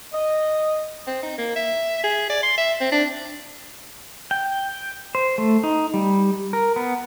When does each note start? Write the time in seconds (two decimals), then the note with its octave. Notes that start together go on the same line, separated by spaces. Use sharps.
0.12 D#5
1.07 C4
1.23 D#4
1.38 A#3
1.56 E5
2.04 G#4
2.30 D5
2.43 C6
2.58 E5
2.81 C4
2.92 D4
4.31 G5
5.15 C5
5.38 A3
5.64 D#4
5.94 G3
6.53 A#4
6.76 B3